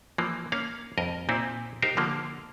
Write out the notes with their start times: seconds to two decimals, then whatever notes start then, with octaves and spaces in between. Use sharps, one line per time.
0.18 E3 F3 A#3
0.52 A#3 C#4 F5
0.98 F2 A#4 D#5
1.29 A#2 C4 D#4 E4
1.82 D#4 G4 A#4 C5 F5
1.97 D3 F3 A#3